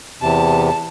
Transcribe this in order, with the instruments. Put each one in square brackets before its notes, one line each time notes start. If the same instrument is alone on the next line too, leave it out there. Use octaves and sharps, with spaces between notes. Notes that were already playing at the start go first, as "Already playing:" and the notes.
[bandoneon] E2 C3 [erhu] A5